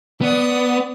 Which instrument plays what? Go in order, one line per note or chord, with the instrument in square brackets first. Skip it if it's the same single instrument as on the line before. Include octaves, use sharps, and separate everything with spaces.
[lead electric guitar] B3 [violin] D5 D#6